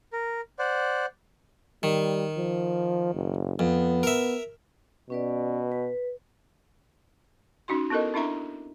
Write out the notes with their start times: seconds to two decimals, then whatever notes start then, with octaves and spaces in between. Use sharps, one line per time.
0.13 A#4
0.59 C5 D5 F#5
1.83 D#3 G3
2.37 F3
3.14 F#1
3.59 F2 B3
4.03 A#4 E5
5.10 B2 C#4 B4 D5
5.72 B4
7.68 C#4 D#4 F#4 C6
7.90 B3 E4 A4 A#4 D#5
8.14 C4 D4 E4 E5 A#5